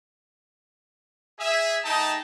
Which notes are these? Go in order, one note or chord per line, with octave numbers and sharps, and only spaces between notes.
G#4 E5
A3 D#4 G#4 D#5 G5 A5